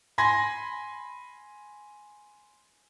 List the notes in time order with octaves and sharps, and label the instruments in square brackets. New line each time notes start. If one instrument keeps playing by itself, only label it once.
[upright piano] G#5 B5 C6 G#6 A#6